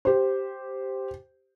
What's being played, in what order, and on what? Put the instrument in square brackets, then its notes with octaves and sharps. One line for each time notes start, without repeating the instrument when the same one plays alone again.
[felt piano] G4 C5